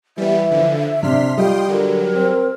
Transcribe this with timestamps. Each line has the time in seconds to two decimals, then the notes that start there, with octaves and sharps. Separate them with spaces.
0.18 E3 G3 B3 E5
0.51 D3 F3
1.03 C3 D4 C6 F6 B6
1.38 G3 F4 D#5 G5 C6
1.69 D3 F#3 A#4
2.15 C4